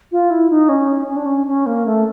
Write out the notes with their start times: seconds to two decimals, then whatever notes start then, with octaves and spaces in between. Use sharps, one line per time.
0.12 F4
0.30 E4
0.50 D#4
0.69 C#4
1.07 C#4
1.16 D4
1.26 C#4
1.47 C#4
1.66 A#3
1.86 A3